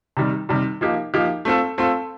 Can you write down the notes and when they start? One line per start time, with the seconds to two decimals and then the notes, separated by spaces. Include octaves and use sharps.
0.17 C3 D#3 G3
0.49 C3 D#3 G3
0.81 F3 A#3 D#4 G4
1.14 F3 A#3 D#4 G4
1.45 A3 C4 F4 A4
1.78 A3 C4 F4 A4